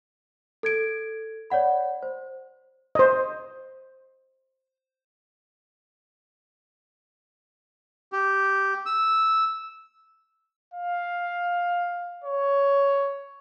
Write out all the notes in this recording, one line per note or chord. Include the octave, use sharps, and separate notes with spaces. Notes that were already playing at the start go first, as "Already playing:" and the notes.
A4 G#6 D7
C#5 D5 F#5 B5
C5
C5 D#5
G4
E6
F5
C#5